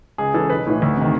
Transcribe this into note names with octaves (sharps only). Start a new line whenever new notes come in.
C#2 G#4
C#3 E3 A4
B1 B4
A2 E3
D2
C3 D#3